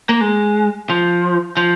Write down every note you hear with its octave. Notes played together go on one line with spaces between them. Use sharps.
A#3
G#3
F3
F3